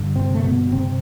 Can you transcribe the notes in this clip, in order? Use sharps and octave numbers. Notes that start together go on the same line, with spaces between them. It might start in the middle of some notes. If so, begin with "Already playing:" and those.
Already playing: G2 D3
C3 C4
A3
B2 B3
C3 C4